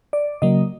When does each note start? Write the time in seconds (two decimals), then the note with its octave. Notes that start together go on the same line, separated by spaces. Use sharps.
0.13 D5
0.42 C#3 F#3 A#3 D#5